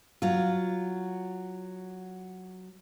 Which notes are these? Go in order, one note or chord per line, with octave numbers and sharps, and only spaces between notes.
F#3 F4